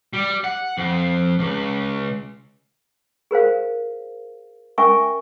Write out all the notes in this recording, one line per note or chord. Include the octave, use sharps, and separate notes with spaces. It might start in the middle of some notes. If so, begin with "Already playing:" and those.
G3
F#5
F2
C#2
G#4 A#4 C5 F5
C#4 A#4 E5 G#5 C#6